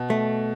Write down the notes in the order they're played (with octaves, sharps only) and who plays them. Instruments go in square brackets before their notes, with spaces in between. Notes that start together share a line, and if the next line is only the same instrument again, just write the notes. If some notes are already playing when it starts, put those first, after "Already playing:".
Already playing: [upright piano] B2
[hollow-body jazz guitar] A3